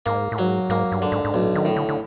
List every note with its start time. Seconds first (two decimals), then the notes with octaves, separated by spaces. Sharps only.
0.06 G#2 A#3
0.32 A2
0.38 G#2 F#3
0.69 G#2 A#3
0.92 G2
1.02 D3
1.12 G#2
1.25 G#2
1.34 B1 A2
1.55 D#3
1.65 A2
1.76 D3
1.89 D3